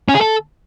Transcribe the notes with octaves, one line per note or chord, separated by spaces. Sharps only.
C#4
G#4
A4